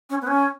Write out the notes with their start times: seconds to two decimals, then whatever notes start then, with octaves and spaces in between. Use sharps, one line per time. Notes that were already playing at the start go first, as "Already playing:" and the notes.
0.10 C#4
0.22 B3
0.27 C#4